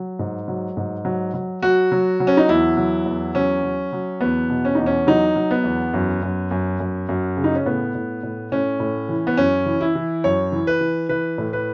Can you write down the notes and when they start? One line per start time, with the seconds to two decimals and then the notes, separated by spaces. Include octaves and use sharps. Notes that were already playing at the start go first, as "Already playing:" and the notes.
Already playing: F#3
0.19 G#2
0.48 F#3
0.77 G#2
1.05 F#3
1.34 F#3
1.63 F#3 F#4
1.92 F#3
2.20 F#3
2.27 C#4
2.37 D#4
2.49 E2 E4
2.77 F#3
3.06 E2
3.35 F#3 C#4
3.63 F#3
3.93 F#3
4.21 E2 B3
4.49 B2
4.65 C#4
4.75 E2 D#4
4.86 C#4
5.07 F#3 D#4
5.36 F#3
5.51 B3
5.64 E2
5.94 F#2
6.23 F#2
6.51 F#2
6.80 F#2
7.09 F#2
7.37 C#3
7.44 D#4
7.55 C#4
7.66 A2 B3
7.95 A2
8.23 A2
8.52 A2 C#4
8.80 A2
9.09 E3
9.27 B3
9.37 F#2 C#4
9.66 E3
9.81 E4
9.95 E3
10.24 F#2 C#5
10.52 E3
10.67 B4
10.81 E3
11.09 E3 B4
11.38 A2
11.53 B4